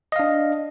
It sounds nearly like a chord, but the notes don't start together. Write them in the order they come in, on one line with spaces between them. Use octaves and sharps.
D#5 F5 D4